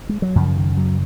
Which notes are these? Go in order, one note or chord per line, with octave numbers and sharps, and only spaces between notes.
G#3
F#3
F#2 C#3 F3
D#3
F#3